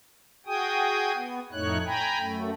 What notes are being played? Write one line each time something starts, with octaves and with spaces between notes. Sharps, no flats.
F#4 G#4 G5 G#5 D#6
B3
F2 A2 A3 D#4 C#5 F#6
G5 G#5 A#5 B5
F#2 A3